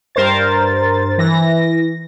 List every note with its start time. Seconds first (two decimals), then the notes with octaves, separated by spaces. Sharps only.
0.15 G2 A#4 C5 A6
1.18 E3 A#6